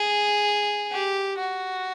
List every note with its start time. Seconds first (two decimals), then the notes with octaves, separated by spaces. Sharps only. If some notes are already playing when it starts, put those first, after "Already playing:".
Already playing: G#4
0.92 G4
1.39 F#4